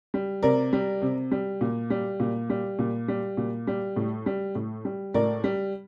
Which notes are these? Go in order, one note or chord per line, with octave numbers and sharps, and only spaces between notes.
G3
C3 A#4 D5
G3
C3
G3
A#2
G3
A#2
G3
A#2
G3
A#2
G3
A2
G3
A2
G3
A2 A#4 D5
G3